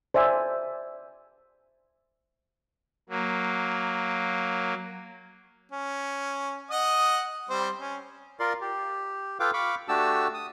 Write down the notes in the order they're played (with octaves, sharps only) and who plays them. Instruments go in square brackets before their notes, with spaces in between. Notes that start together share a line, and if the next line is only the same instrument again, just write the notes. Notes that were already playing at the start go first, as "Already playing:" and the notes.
[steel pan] C5 D5 E5 G#5
[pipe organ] F#3 A#3
[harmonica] C#4
D#5 F#5 D#6
G3 C4 C5
C#4
[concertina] F4 A#4 D5 C6
G4
F4 A4 B4 F5 G5 D6
F5 B5 C#6 D6
A3 D4 F#4 G4 A5 E6
D#6